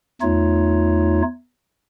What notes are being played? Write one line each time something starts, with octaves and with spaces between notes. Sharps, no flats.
E2 A3 D#4 F4 C#5